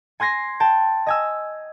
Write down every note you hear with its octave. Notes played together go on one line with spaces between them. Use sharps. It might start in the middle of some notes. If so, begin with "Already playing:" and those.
G#5 C6 G#6 A#6 C7
G5 A5
D#5 G#5 E6